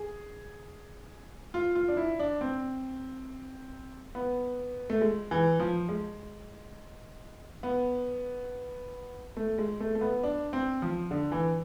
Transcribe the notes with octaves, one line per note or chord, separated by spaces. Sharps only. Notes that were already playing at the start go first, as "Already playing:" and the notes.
Already playing: G#4
F4
F4
D4
E4
D4
C4
B3
A3
G#3
E3
F3
G#3
B3
A3
G#3
A3
A3
B3
D4
C4
F3
D3
E3